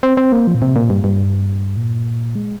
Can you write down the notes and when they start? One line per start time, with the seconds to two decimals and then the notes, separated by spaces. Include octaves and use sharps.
0.03 C4
0.17 C4
0.32 A#3
0.47 F3
0.55 A#2
0.62 C3
0.76 A#2
0.90 G2
1.04 G2
1.77 A#2
2.35 G#3